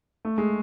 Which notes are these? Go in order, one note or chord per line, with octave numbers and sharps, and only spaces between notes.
A3
G#3